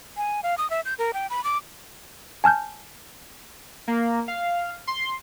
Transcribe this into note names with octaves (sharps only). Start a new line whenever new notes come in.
G#5
F5
D#6
E5
G6
A#4
G5
B5
D6
G#5 A5 F6 G6
A#3
F5
C6